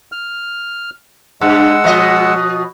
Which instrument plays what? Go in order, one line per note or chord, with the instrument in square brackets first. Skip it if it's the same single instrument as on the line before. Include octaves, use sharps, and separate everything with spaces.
[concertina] F6
[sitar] G2 [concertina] G#3 F#5 E6
[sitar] B2 F3 D#5